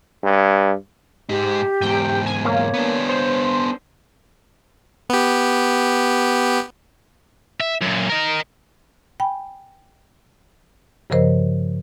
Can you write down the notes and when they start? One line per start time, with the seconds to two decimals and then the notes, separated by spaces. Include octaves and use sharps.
0.23 G2
1.29 G#2 D#4 G4
1.81 E2 G#2 G5
2.26 G#5
2.45 A#3 C#5
2.74 B3 D4
3.09 C5
5.10 B3 G4
7.60 E5
7.82 F#2 A#2
8.10 A#4 D#5
9.20 G5 G#5 B5
11.10 G2 C#3 F3 A#4 C5 D#5